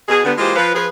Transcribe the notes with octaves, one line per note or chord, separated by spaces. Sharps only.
B2 G#4
D3 G3 B3
E3 G#3 A#3 F4 G4 C5
F3 B4
F3 G#4 B4